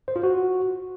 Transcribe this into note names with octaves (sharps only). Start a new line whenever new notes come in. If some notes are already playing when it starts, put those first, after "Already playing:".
C5
F4
F#4